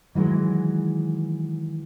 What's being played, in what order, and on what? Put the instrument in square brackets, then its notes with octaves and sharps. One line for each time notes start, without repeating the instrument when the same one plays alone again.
[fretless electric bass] D#3 E3 F#3 G#3